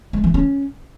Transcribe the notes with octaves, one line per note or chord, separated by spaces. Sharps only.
G#3
E3
C#4